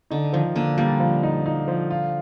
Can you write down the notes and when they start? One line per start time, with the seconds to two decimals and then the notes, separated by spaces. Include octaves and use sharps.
0.10 D3 D#4
0.33 D#3 F3
0.56 D3 A#3
0.78 G3 A#3
1.00 F3
1.23 D#4
1.46 D#4
1.68 F3
1.90 F4